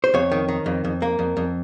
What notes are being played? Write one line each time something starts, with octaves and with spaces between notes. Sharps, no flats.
C5
F2 C#5
D#3
D#3
F2
F2
A#3
F2
F2